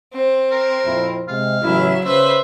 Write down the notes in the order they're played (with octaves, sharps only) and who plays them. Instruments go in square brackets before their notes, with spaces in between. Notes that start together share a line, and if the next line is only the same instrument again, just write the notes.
[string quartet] C4
[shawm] A#4
[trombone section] F2 A#2 E4
[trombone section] C3 G#3 [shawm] F5
[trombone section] A1 C#3 E4 [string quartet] F#3 E5
[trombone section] C#3 [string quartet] B4 C5 [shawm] E5